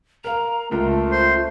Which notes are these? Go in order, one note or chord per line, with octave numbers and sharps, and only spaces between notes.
A#4 F5 A#5
C#2 A3 F4 A#4
C5